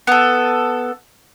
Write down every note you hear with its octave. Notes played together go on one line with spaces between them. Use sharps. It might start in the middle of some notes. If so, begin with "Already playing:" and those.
B3 A4